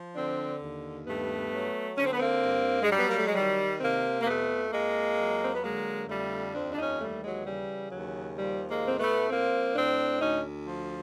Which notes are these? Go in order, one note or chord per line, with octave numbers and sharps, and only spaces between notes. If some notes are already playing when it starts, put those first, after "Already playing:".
Already playing: F3
D3 C4 D4
D#2
G2 A3 B3
F#3
D3 C#4
C4
B3
A#3 C4
G2
G#3
F#3 G3
B3
A#3
A3
G#3
D#3 G3
C3 A#3 C4
A#3
F2 A3 B3
F2 G#3 A#3
F#3
C4
B3
D3 G#3 A#3
F2 G3 A3
D#2 C4 D4
D4
C#4 D#4
E3 G3 A3
F#3 G#3
C#3 G3
D#2 F#3
F3 G3
G#3 A#3
A2 C4
A3 B3
F3 A#3 C4
A2 C4 D4
D2 C#4 D#4
F3